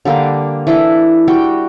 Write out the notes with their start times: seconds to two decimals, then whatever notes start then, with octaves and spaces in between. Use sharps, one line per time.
0.05 D3 G3 A#3 D4
0.67 E3 D4 E4 A4
1.28 G3 F#4 G5